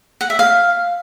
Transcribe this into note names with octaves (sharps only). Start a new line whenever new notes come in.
F#5
E5
F5